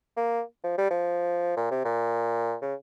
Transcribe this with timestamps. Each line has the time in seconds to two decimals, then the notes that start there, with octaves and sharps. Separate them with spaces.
0.17 A#3
0.64 F3
0.78 G3
0.90 F3
1.57 A#2
1.71 C3
1.84 A#2
2.62 C#3